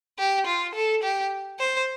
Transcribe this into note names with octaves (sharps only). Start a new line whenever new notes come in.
G4
F4
A4
G4
C5